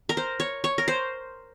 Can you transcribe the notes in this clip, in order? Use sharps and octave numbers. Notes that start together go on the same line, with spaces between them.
A#4
C5
C#5
C#5
A#4
C5